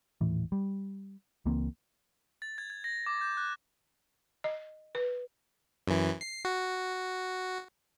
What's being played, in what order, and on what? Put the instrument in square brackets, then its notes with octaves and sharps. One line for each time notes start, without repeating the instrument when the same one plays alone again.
[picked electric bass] D#1 A2 E3
G3
C#2 E3 A#3 C4
[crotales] A6
G#6
G#6
A#6
D6
G6
F#6
[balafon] D#5
B4
[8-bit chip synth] F#2 E3
C7
F#4